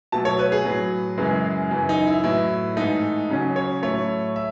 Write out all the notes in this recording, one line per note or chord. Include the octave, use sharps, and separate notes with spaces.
B2 F#3 A3 A5
C#5
B4
G#4
A2 F#3 B3
F#2 C#3 E3 G#3 B3
F#2 C#3 E3
D#4
E4
A2 F#3 B3 E4
G#2 E3 A3 D#4
C#3 F#3 C#4
C#5
A2 F#3 A3 C#5
E5